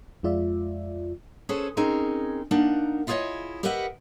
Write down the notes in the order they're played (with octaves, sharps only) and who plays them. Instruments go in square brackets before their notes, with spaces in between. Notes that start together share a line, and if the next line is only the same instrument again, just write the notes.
[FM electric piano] F2 G#3 F4 D5 E5
[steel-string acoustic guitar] C#4 G#4 A4 B4 C5
C4 C#4 D#4 G#4 A#4
A#3 D4 D#4 A#4 F#5
E4 F4 G#4 B4 C#5 D#5
G4 A#4 B4 D#5 E5 F#5